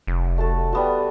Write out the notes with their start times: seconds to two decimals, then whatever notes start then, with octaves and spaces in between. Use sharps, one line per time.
0.07 F1
0.38 A3 F#4 A4
0.73 G3 B3 F#4